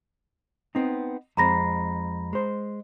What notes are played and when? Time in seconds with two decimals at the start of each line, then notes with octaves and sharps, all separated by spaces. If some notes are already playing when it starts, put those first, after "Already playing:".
0.75 B3 C4 D#4
1.37 F2 G#3 C4 A#5 B5 A#6
2.33 G#3 C5